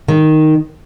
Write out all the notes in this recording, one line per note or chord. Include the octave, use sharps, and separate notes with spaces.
D#3